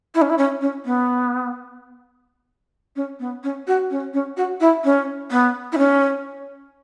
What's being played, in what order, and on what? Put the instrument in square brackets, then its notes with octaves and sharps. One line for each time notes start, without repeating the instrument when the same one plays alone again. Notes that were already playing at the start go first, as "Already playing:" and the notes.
[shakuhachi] E4
C#4
E4
C#4
C#4
B3
C#4
B3
C#4
F#4
C#4
C#4
F#4
E4
C#4
B3
E4
C#4